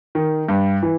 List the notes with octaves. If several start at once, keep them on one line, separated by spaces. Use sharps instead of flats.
D#3
G2
E3